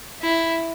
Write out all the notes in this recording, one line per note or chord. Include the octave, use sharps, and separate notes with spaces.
E4